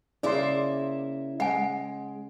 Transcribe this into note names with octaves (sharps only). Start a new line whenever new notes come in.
C#3 A#3 E4 D5 E5 C6
G#3 F#5 G#5